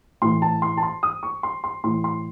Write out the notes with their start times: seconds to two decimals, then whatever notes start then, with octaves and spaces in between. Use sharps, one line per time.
0.22 A2 E3 C6
0.42 A5
0.62 C6
0.77 A5
0.83 C6
1.03 D#6
1.23 C#6
1.43 C6
1.64 C6
1.84 A2 E3 C6
2.04 C6